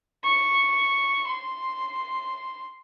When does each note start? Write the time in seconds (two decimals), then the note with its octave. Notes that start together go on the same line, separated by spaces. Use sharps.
0.24 C#6
1.28 C6